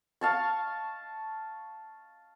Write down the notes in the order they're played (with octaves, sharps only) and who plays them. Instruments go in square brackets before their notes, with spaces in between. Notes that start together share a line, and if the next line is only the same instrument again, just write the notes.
[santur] F5 A5 C#6